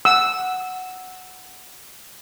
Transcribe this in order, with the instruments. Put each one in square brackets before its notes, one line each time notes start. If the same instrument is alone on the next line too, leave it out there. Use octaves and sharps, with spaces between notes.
[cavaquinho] F#5 [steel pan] E6